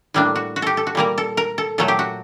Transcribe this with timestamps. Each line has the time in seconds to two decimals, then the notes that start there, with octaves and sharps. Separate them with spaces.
0.14 A2 G3 A#3 D4
0.36 F#4
0.56 F#4
0.62 G4 A4
0.77 A4
0.87 F#4
0.95 A#2 G3 A#3 A#4
1.18 A4
1.37 A#4
1.58 A4
1.78 A#2 F#3 A3 A4
1.88 G4
1.99 F#4